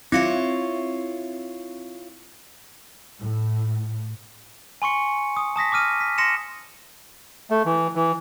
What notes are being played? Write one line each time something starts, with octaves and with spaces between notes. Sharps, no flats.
C4 E4 F4 C#5 A#6 C#7
A2
G#5 C6 C#6 C#7
D#6
A5 D#6 A#6 B6
D6 D#6 F6 D#7
B6
C6 A#6 C#7 E7
A3
E3
E3